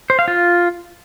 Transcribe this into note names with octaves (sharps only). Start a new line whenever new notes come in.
C5
F5
F4